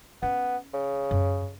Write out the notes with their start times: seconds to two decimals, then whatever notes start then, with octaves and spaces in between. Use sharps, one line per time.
0.23 B3 C#4
0.74 C#3
1.11 F#2